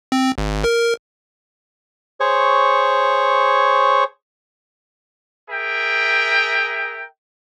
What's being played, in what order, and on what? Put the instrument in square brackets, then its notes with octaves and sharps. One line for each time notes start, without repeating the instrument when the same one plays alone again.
[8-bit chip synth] C4
G#1
A#4
[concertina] G#4 C5 C#5 C#6
[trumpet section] G#4 A#4 E5 G5